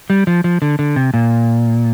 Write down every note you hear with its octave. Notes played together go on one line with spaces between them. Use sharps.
G3
F3
F3
D3
D3
C3
A#2